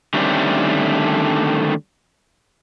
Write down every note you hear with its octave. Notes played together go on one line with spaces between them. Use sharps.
D3 D#3 G3 A3 C4 C#4